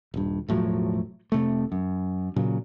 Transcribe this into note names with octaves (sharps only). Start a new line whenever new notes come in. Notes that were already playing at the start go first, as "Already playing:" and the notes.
D#1 G2
E1 A2 F3 F#3
F1 C3 A3
F#2
A#2 C#3 F#3